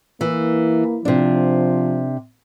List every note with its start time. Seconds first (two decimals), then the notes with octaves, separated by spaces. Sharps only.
0.21 E3 A#3
1.05 C3 F3 D4